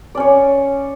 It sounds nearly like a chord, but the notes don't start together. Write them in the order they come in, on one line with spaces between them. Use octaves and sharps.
D5 C#4 C#5